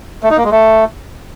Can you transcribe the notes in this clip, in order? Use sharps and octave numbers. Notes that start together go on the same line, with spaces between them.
A3
D#4
A#3
G#3
A3